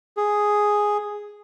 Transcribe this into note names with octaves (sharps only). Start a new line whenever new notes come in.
G#4